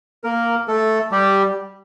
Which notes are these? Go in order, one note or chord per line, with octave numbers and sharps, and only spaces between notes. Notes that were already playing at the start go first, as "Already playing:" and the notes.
A#3 A#4
A3 A4
G3 G4